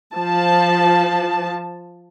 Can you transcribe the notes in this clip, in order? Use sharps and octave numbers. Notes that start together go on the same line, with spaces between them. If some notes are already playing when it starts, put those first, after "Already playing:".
F3 A5